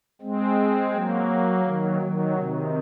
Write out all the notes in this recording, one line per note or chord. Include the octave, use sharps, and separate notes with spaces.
G#3 C4
F#3 A#3
D#3 F#3
D#3 F#3
C3 D#3